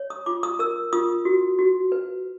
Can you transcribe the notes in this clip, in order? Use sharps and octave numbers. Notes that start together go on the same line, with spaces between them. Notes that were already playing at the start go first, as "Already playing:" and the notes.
Already playing: C#5
D#6
F4 D6
D#6
A#4 E6
F4 D#6
F#4
F#4
B4